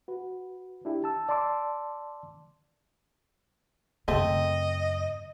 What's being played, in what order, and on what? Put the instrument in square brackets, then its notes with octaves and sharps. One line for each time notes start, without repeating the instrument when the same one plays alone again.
[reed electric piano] F#4 B4
D4 E4 G4
A5 E6
D5 A5 C6 D6 E6
[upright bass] F#2 C#3 [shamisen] A3 C4 [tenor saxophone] D#5